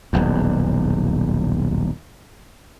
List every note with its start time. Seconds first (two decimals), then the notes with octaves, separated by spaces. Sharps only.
0.13 D#1 B1 E2